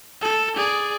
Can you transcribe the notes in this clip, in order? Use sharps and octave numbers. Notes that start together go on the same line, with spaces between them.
A4
G#4 D5